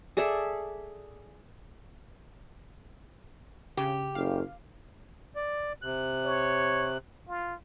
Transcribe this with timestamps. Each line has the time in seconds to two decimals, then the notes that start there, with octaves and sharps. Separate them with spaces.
0.17 G#4 A4 D5 E5
3.77 C#3 G4
4.15 F#1 F5
5.36 D5
5.82 C3 F#6
6.25 C#5
7.28 F4